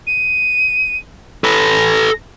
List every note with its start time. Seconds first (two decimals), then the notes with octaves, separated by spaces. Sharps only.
0.07 D#7
1.44 A4 B4 A#6